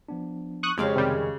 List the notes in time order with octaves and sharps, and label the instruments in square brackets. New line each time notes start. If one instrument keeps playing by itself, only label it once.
[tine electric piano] F3 B3 D4
[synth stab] C#6 D#6 F#6
[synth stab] F2 [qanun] C#3 G4 F5 [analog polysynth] G#3 C#5
[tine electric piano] F2 D#3 [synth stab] C3 G3